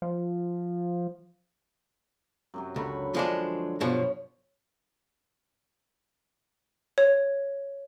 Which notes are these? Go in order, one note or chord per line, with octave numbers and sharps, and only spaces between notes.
F3
F#2 C3 F#3
C#2 D3 B5 C#6
F3 G#3 D4
G2 B2 F3 C#5
C#5